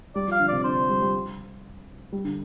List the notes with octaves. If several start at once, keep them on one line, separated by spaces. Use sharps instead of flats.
G3 D5
F3
F5
D3
C3 D5
D3 C5
G3
G3
G3
D3